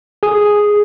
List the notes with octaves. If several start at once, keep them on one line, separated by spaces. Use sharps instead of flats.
G#4 D#6